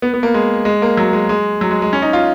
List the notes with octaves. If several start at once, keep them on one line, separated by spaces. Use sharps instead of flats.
B3
B3
A#3
G#3
G#3
A#3
F#3
G#3
G#3
F#3
G#3
G#3
C#4
D#4
F4